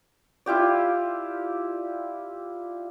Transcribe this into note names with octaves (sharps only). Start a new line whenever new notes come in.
E4 F4 G4 D5